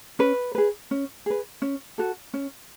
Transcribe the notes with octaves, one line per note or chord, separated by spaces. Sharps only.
C#4 B4
G#4 B4
C#4
G#4 B4
C#4
F#4 A4
C#4